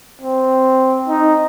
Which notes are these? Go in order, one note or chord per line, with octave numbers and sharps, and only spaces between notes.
C4
D#4